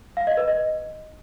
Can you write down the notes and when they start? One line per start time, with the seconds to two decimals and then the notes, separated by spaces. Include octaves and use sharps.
0.17 F5
0.27 D#5
0.37 B4
0.48 D#5